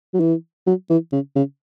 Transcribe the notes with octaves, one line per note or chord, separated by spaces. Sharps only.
F#3
E3
F#3
E3
C#3
C#3